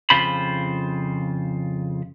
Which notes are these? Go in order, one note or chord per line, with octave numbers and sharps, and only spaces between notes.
F2 C#3 F4 C5 B5